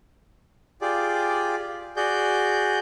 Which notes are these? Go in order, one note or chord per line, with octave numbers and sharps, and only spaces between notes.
F4 G4 G#4 D5
F#4 G#4 D5 G6